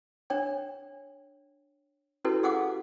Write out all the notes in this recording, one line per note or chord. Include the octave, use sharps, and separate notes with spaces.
D4 C#5 G5
C#4 E4 F#4 G4 A4 B4
G4 G#4 F5 F#5 D6 D#6